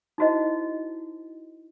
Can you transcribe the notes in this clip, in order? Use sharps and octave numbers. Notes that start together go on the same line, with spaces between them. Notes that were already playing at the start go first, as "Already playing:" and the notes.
D#4 E4 F#4 C5 D#5